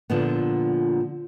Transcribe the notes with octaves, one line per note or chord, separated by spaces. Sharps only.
A#2 D3 F3 B3